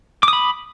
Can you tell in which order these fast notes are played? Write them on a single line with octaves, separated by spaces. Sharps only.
D6 D#6 B5